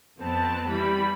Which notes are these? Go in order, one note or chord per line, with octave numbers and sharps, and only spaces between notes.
F2 B3 C4 A5
E3 G3 B5